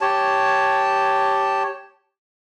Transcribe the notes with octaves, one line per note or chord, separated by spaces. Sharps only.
G4 C#5 A5